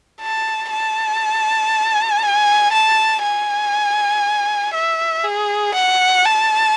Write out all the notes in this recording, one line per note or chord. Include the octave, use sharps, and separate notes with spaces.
A5
A5
G#5
A5
G#5
E5
G#4
F#5
A5